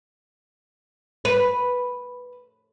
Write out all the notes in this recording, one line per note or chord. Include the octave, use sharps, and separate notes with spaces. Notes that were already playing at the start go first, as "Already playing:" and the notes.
B4